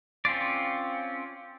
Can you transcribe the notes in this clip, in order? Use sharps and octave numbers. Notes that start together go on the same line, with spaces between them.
C4 C#4 F4 D5